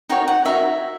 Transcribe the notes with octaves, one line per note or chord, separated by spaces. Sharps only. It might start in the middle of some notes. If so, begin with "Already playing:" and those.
D#4 F#4 A#4 C#5 G5
F#5
D#4 F#4 A#4 C#5 E5